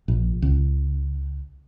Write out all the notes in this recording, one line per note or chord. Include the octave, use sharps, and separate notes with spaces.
A#1
C#2